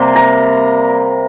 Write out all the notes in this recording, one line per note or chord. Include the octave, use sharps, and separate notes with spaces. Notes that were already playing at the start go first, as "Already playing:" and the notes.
Already playing: C3 G3 A#3 C6
A#5